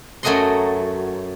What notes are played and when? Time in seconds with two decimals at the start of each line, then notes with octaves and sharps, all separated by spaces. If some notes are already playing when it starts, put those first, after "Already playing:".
0.23 F#2 F#3 A3 D#5 F#5 C6